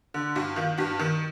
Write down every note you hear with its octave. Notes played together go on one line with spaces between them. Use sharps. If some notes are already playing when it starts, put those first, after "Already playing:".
D3
G2 F#4
D#3 F4
G2 F#4
D#3